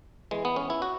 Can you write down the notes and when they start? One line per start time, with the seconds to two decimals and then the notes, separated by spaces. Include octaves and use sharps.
0.31 E2 E3 G#3
0.45 B3
0.56 C#4
0.70 E4
0.82 F#4